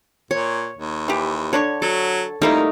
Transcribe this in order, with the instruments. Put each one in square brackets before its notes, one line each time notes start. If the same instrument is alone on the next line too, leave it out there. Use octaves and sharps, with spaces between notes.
[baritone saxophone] A#2 [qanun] C#5
[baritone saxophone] D#2
[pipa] E3 G4
[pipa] D3 D4 C#6 [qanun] C#5
[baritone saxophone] F#3 [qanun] A4
[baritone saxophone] F2 [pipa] G3 A#3 E4 [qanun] A3 D#4 A#4